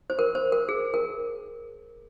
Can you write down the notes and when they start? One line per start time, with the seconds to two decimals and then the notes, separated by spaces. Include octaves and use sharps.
0.10 C5
0.19 A#4
0.35 C5
0.52 A#4
0.69 G#4
0.94 A#4